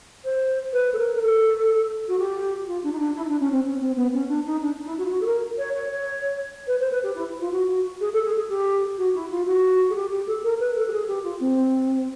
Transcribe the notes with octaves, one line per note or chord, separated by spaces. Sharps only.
C5
B4
A4
A#4
A#4
A4
F#4
G4
F4
D4
D#4
D4
E4
D#4
D4
C#4
C4
C#4
C4
B3
C#4
D4
D#4
D4
E4
F#4
F4
F#4
A4
A#4
C#5
C#5
C#5
B4
C5
B4
G4
E4
F4
F#4
F#4
G#4
A4
G#4
G#4
G4
F#4
E4
F4
F#4
G#4
G4
G4
A4
A#4
B4
A4
G4
G#4
G4
F4
C4